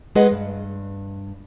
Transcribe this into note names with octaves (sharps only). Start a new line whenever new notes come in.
G#3 G#4 B4 D#5 F#5
G2